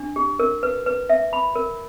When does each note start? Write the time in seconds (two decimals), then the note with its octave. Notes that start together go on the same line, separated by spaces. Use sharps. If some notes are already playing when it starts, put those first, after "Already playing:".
Already playing: D4
0.16 G4
0.39 A#4
0.63 B4
0.86 B4
1.09 E5
1.33 B5
1.55 A#4